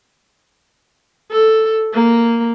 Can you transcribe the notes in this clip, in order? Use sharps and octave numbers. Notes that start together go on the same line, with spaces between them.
A4
A#3